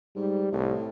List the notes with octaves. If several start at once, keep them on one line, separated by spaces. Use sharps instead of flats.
G#2 G3
C2 A2